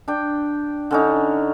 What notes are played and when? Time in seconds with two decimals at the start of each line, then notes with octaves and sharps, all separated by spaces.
0.08 D4 G5
0.91 D3 C#4 D#4